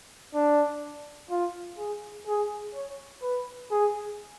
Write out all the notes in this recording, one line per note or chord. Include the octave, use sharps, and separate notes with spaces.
D4
F4
G#4
G#4
C#5
B4
G#4